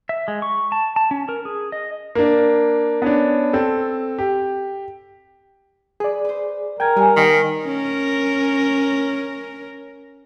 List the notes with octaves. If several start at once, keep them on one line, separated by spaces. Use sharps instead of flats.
E5
G#3
C#6
A5
A5
C#4
A#4
G#4
D#5
A#3 D4
B3 C#4 D4
C4 A4
G4
G#4 B4 D5
B4 C5
A#4 G5 G#5 G#6
G3 G#3 F#5 G#5
D#3 B3
C#4 A#4